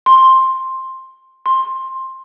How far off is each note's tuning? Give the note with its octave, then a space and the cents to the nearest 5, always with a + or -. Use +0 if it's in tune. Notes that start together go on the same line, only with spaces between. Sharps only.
C6 +10
C6 +15